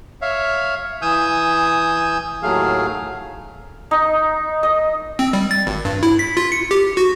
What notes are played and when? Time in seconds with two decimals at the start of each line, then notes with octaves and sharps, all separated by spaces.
0.22 C#5 E5 F5
1.02 E3 G#5 D#6 E6 G6
2.42 D#2 A2 F#3 A3 G#4 F5
3.91 D#4
4.63 D#5
5.19 C4
5.33 G3
5.51 A6
5.67 G#1
5.85 G2
6.03 E4
6.19 B6
6.37 F4
6.52 C#7
6.71 G4
6.97 F#4